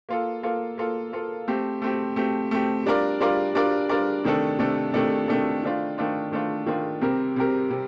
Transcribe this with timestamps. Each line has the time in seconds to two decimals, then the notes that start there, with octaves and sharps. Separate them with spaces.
0.09 A#3 F4 A4
0.43 A#3 F4 A4
0.78 A#3 F4 A4
1.13 A#3 F4 A4
1.48 A3 C4 G4
1.82 A3 C4 G4
2.16 A3 C4 G4
2.51 A3 C4 G4
2.86 G3 D4 F4 A#4 D5
3.20 G3 D4 F4 A#4 D5
3.55 G3 D4 F4 A#4 D5
3.89 G3 D4 F4 A#4 D5
4.24 C3 D#3 A3 D4 A4
4.59 C3 D#3 A3 D4 A4
4.93 C3 D#3 A3 D4 A4
5.28 C3 D#3 A3 D4 A4
5.63 D#3 A3 D4 F4
5.98 D#3 A3 D4 F4
6.32 D#3 A3 D4 F4
6.66 D#3 A3 D4 F4
7.01 C3 G3 C4 G4 A#4
7.36 C3 G3 C4 G4 A#4
7.70 C3 G3